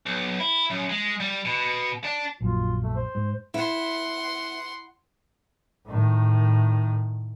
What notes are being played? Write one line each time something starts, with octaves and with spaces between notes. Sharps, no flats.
B1
E4
F#2
G#3
G3
B2
D4
A#1 F#2 F4
A3
C5
G#2
E4 F#5 C6
A2 D#3